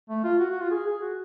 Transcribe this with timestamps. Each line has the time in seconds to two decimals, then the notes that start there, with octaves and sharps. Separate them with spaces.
0.09 A3
0.24 F4
0.40 F#4
0.50 F#4
0.61 F4
0.71 G#4
0.86 G#4
1.02 F#4